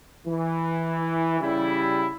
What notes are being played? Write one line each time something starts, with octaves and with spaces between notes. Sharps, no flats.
E3
C#3 G3 E4